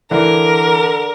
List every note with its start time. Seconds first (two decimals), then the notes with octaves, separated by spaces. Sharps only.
0.11 D3 E3 A#4